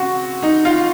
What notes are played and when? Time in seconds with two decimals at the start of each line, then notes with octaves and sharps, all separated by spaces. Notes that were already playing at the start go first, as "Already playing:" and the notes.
Already playing: C#3 C4 F#4
0.43 D#4
0.65 F4